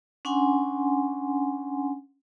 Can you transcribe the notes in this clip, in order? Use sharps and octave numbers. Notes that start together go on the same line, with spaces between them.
C#4 D4 F#5 G#5 C6